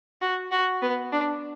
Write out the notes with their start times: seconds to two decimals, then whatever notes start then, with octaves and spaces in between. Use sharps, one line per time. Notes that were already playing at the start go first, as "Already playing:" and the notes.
0.22 F#4
0.51 F#4
0.82 B3
1.12 D4